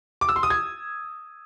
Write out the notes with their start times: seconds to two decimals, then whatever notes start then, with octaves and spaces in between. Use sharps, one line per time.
0.21 D6
0.29 E6
0.36 C6
0.43 D#6
0.50 G#6